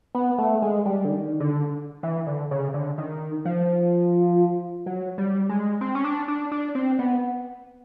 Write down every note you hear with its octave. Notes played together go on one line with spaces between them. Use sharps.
B3
A3
G#3
G3
D3
D#3
D3
E3
D3
C#3
D3
D#3
F3
F#3
G3
G#3
C4
C#4
D4
D4
D4
C4
B3